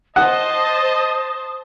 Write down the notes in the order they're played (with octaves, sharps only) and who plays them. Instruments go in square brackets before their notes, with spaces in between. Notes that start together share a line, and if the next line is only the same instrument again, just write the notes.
[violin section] C5 A5 [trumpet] D#5 [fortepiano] F#5 [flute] D#6